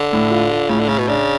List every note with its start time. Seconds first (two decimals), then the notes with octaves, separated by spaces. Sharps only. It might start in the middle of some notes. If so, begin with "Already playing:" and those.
Already playing: D3
0.13 A2
0.31 F4
0.51 F4
0.69 A2 C#3
0.80 D3
0.88 A2 C#3
0.98 B2
1.08 C#3 D4